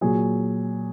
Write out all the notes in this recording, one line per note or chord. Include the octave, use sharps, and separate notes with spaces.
A#2 F#3 G#4